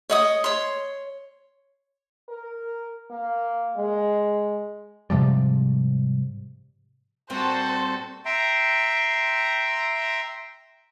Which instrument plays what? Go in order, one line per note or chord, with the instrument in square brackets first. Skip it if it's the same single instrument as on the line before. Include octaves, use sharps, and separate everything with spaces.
[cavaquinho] C#5 D#5 D#6
C#5 C6
[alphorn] A#4
A#3
G#3
[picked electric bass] G#2 C3 F3 G3
[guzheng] A#2 G3 C4 [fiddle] F#4 A4 [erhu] C5
[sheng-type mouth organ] E5 G5 A#5 C6